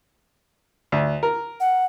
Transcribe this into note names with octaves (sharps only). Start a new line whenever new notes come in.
D2
A#4
F#5